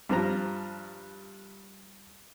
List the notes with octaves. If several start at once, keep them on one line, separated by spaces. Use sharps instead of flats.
G2 F3 A#5